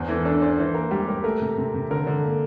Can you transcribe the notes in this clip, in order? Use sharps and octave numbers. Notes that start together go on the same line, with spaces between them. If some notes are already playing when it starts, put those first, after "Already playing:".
Already playing: E2 C5
E3 A4
A#4
D4 A4
D4 C5
E3 C5
A#3 A#4
G3 G4
G3 A#4
A3 A#4
C3
C3
C3
D3 A#4
D3
A#3